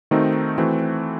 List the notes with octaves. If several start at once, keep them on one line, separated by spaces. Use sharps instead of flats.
D#3 A3 C4 D#4 F#4
E3 A3 C4 F#4